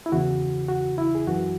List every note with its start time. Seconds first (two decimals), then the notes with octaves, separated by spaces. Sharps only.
0.06 E4
0.12 E2 C#3 E3 F#4
0.69 F#4
0.98 E4
1.15 G#4
1.27 F#2 E3 F#4